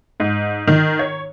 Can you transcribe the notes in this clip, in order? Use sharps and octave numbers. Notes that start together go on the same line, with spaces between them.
G#2
D#3
C#5